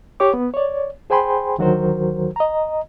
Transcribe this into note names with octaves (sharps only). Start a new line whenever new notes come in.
G4 C#5 D6
B3
C#5 D5
G#4 C5 G5 G#5 B5 C6
D2 D#3 F#3 F#4 A#4 C5
D#5 A#5